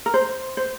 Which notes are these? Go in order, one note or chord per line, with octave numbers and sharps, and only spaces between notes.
A#4
C5
C5